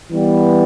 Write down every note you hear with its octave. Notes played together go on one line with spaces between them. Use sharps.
E3 G3 B3